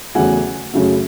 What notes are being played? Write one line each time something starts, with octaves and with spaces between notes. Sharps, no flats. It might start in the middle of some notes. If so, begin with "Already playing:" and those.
E2 C#3 F#3 A3 F#5 G#5
F#2 C#3 F#3 A3